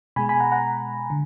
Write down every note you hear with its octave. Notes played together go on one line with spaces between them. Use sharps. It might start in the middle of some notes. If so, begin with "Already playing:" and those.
B2 G#3 G#5 B5
G#5 B5
F#5 A#5
F#5 A#5
D3